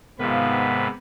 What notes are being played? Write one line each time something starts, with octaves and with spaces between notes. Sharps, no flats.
G#2 C3 D#3 B3 F4 B4